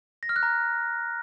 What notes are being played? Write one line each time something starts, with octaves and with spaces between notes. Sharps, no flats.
A#6
F6
F#6
A#5